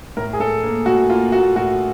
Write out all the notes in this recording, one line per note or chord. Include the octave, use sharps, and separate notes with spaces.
A2 A#4
G#4
A2 A4
A#3
A2 F#4
A#3 F4
A#3 F#4
A2 F#4